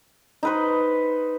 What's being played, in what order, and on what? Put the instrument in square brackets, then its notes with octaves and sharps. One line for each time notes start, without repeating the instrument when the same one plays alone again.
[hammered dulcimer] D#4 B4 C5